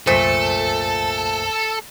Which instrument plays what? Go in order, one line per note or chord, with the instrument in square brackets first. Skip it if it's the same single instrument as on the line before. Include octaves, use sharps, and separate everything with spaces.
[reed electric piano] C2 F#2 C5 [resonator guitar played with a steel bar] A#2 A3 [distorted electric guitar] A4